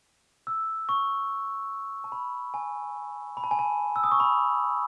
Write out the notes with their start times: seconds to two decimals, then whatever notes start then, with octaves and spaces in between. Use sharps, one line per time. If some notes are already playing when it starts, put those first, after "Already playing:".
0.47 E6
0.89 C#6
2.04 A5
2.12 B5
2.54 G#5
3.37 B5
3.44 A5
3.51 G#5
3.59 A5
3.96 E6
4.04 D#6
4.12 C#6
4.20 B5